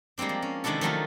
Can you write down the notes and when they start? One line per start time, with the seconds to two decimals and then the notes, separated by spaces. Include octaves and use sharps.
0.18 G3 G#3 A#3 C4 D4
0.29 F3
0.42 C#4
0.64 C3 D#3 G#3 D4 E4 A4
0.81 D#3 F3 F#3 A3 D#4 F4